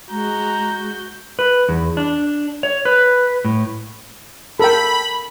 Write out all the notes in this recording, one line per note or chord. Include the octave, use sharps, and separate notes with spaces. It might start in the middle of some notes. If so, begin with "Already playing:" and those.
G#3 F#4 A#5 G6
B4
E2
D4
C#5
B4
A2
A4 A#4 G5 B5